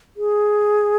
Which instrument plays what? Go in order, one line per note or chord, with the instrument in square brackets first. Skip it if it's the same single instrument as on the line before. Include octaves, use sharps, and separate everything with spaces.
[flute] G#4